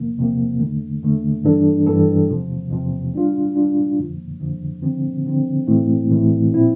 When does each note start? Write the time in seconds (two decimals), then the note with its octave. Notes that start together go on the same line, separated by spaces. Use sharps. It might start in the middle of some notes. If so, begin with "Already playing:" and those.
Already playing: E2 C3 F3 A#3
0.18 E2 C3 F3 A#3
0.60 E2 D3 A3
1.02 E2 D3 A3
1.44 G2 E3 G3 D4 A4
1.87 G2 E3 G3 D4 A4
2.29 E2 C3 F3
2.71 E2 C3 F3
3.14 G3 D4 F4
3.56 G3 D4 F4
3.98 F2 D3 F3
4.40 F2 D3 F3
4.82 D3 F3 C4
5.26 D3 F3 C4
5.67 A2 E3 A3 C4 E4
6.10 A2 E3 A3 C4 E4
6.52 A#2 F3 C4 E4